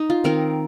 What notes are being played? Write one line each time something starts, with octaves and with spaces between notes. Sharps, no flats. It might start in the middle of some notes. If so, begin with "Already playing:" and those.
Already playing: D#4 D#5
F4
D#3 C4 D#4 A#4